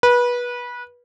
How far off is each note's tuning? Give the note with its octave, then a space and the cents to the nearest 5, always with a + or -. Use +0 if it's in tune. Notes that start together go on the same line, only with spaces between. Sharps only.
B4 -25